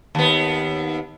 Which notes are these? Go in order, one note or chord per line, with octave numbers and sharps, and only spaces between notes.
D#2 B3